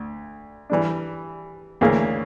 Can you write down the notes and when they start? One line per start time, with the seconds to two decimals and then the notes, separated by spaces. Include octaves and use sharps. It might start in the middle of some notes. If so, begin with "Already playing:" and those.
Already playing: D2
0.70 E3 G3 D4
1.81 D2 C#3 E3 A#3 C#4